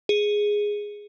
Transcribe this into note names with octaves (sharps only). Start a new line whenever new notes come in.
G#4